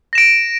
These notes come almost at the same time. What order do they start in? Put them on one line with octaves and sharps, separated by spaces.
A#6 E7 D7